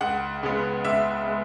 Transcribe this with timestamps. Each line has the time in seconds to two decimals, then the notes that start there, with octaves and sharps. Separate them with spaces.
0.01 C#2 F#5
0.43 C#3 G#3 B3
0.85 C#2 E5
1.26 G#3 B3